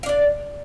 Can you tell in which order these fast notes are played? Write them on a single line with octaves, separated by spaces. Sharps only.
F5 D4 D5